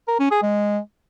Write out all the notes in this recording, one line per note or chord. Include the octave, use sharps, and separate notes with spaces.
A#4
C#4
G#4
G#3